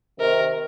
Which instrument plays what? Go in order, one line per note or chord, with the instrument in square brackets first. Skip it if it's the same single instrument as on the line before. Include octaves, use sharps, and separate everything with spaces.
[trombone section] C3 D#3 [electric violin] A#4